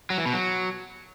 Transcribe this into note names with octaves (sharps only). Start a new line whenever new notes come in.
F#3
E3
B2
F#3